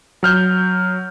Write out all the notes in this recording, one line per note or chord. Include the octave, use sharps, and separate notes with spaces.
F#3 F6 G6